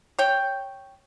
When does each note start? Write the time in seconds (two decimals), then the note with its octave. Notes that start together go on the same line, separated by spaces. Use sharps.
0.19 C#5 G5